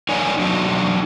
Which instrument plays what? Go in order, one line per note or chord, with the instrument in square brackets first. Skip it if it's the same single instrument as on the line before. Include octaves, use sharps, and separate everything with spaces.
[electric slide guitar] D#4 A#4 C#5 D5 F5 G#5
F#3 D4 D#4 F#4